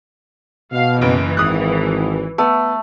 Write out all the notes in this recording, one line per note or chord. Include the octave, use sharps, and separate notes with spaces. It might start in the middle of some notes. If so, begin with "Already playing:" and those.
B2 F5
F#1 C#3 E3 D7
G#1 D#6 F#6
A3 B3